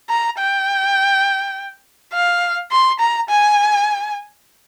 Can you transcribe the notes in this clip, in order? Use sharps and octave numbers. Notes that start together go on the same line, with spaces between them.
A#5
G5
F5
C6
A#5
G#5